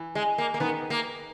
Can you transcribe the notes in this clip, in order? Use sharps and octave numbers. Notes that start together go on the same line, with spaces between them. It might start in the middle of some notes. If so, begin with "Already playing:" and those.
Already playing: E3
G#3
A#3
A#3
D#3 B3
A#3